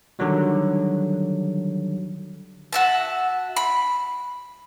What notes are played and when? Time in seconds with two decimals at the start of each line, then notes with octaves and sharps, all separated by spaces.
0.19 D3 D#3 F#3 G3
2.73 F#4 E5 A5
3.56 B5